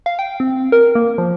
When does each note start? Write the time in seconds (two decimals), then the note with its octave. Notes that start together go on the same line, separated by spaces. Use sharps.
0.06 F5
0.19 G5
0.40 C4
0.72 A#4
0.95 A#3
1.18 F3